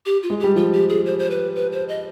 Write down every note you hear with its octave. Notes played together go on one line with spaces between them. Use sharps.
G4
F4
G#3
G3 G4
F3 F4
G4
G#4
C5
C5
B4
B4
C5
D#5